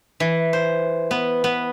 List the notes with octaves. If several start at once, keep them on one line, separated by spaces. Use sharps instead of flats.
E3
C5
B3
B3